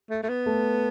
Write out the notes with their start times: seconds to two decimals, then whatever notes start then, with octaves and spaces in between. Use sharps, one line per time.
0.10 A3
0.23 A3
0.29 B3
0.46 A3